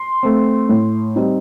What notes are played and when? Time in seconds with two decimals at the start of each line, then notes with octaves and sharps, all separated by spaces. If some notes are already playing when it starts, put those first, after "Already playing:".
Already playing: C6
0.23 A3 C4
0.69 A2
1.16 G3 C4 D#4